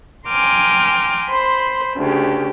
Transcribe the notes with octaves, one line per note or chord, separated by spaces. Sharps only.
G5 G#5 A#5 C6 D6 F6
C5 B5 C6
D2 C#3 G4